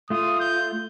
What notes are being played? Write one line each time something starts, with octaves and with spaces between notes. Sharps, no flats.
A3 F4 D#6
G6